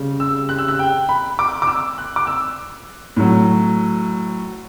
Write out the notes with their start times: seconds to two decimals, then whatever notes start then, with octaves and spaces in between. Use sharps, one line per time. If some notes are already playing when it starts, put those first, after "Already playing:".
Already playing: C#3 G3
0.20 E6
0.49 F#6
0.58 E6
0.68 F#6
0.79 G5
1.09 B5
1.39 D6
1.62 D6
1.67 E6
1.98 F#6
2.16 D6
2.27 E6
3.17 A2 F#3